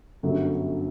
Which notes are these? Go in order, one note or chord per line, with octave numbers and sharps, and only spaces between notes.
G1 F#2 D3 F#3